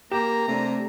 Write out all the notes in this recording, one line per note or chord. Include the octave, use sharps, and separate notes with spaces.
A#3 G4 G5 A#5 E7
C3 A3 D4